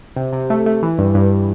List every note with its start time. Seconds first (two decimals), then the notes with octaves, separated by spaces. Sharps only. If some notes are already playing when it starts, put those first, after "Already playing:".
0.16 C3
0.33 C3
0.50 A3
0.66 A3
0.83 E3
0.98 G2
1.15 G2